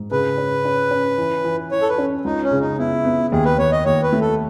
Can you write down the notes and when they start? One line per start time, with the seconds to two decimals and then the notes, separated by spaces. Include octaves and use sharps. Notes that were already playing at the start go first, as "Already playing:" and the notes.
Already playing: G#2
0.11 C#3 B4
0.38 C#4
0.65 C#4
0.91 C#4
1.18 E3
1.44 E3
1.72 E3 C#5
1.82 A4
1.89 B4
1.98 C#4
2.25 C#2 D#4
2.43 C#4
2.51 C#3
2.60 D#4
2.78 B3 E4
3.05 B3
3.32 D#2 G#4
3.45 B4
3.58 D#2 C#5
3.72 D#5
3.85 D#2 C#5
4.03 B4
4.13 A3
4.21 A4